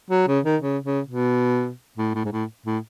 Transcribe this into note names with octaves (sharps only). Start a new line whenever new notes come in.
F#3
C#3
D#3
C#3
C#3
B2
A2
A2
G#2
A2
A2